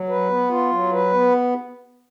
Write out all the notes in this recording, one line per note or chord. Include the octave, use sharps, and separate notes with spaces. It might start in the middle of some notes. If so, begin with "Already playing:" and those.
Already playing: F#3
B4
B3
F4
F#3
B4
B3